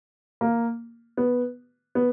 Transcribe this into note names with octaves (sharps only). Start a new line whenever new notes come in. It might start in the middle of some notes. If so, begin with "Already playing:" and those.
A#3
B3
B3